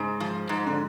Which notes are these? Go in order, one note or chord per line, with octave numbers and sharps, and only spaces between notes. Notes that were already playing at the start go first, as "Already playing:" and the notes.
Already playing: G#2 C#3
F3
G#2
D3